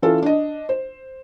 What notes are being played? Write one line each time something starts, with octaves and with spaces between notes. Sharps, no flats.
E3 C#4 F4 A4
D4 D#5
C5